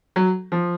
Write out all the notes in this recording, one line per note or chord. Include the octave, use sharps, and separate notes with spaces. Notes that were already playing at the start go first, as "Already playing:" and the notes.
F#3
F3